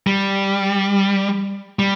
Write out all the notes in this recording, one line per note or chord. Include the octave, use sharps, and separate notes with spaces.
G3
G3